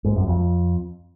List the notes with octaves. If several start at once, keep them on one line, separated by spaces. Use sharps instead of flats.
G#2
F#2
F2